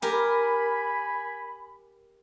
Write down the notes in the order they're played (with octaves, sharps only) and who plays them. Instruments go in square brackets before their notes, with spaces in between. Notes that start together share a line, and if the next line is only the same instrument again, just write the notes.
[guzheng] G4 A#4 [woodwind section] G#5 B5